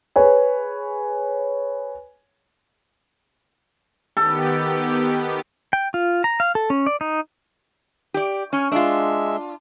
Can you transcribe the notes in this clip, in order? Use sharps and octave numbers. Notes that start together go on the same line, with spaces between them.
G#4 B4 C#5 G#5
D#3 B3 G4 A4
G5
F4
A#5
F5
A4
C#4
D5
D#4
G4 D5
C#4 G#5 F6
G#3 D4 F4 E5